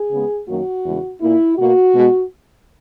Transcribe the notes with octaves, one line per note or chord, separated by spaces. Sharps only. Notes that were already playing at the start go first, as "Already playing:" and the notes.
Already playing: G#4
C#3 G#3 B3
F#2 D#3 F#3 A#3 F#4
E2 C#3 G#3
A#2 A#3 E4
B2 A#3 F#4
B2 G#3 B3